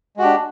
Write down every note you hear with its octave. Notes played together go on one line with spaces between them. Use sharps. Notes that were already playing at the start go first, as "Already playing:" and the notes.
G#3 D4 F#4 G4